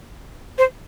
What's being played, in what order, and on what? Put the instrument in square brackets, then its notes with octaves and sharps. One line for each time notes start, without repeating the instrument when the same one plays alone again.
[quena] C5